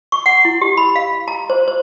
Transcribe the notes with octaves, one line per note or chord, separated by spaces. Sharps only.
C#6
F#5
E4
G4
B5
F5
A#5
C5
C5